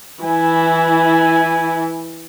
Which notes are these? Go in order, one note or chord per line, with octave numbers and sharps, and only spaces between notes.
E3 E4 G#5